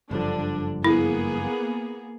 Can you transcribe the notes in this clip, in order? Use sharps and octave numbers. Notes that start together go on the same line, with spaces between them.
F#1 G2 D3 F3 D4
A#3 B3 E4 G#4